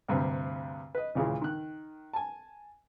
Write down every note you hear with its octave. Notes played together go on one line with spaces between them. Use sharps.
D2 G2 C3
B4 D#5
D#2 A#2 C#3 E3 G#3
D#3 F#6
G#5 A5